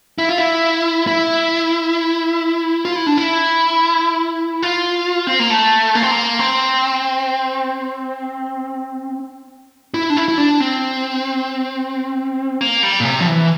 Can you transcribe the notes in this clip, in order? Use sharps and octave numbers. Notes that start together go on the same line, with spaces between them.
E4
F4
E4
E4
F4
E4
D4
E4
F4
C4
A#3
A3
A#3
C4
A#3
C4
E4
D4
E4
E4
D4
C4
A#3
G3
A#2
C3
F3
E3